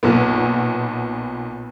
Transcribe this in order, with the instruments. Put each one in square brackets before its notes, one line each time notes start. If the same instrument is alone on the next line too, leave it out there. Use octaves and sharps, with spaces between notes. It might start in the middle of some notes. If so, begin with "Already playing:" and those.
[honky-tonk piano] B1 A#2 B3